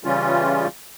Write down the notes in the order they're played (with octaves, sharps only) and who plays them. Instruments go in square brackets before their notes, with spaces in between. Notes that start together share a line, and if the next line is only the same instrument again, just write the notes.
[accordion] C#3 E3 G3 C#4 F4